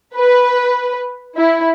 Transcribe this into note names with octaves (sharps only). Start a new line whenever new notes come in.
B4
E4